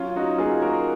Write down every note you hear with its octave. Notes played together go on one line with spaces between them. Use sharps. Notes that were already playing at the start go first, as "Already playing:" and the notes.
Already playing: F#3 C#4 F4
C#4 D#4 F#4
A#3 F4 G#4
A#3 F#4 A#4